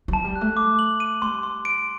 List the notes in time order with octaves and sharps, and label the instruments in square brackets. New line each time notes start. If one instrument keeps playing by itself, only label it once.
[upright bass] F#3
[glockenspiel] A5
[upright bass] G3
[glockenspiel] F#6
[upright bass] A3
[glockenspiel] D6
F#7
D#7
[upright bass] G3 [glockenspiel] C6
[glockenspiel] C6
D7